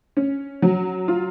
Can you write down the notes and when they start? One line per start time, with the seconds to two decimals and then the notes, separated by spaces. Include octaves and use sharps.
0.17 C#4
0.62 F#3
1.08 F4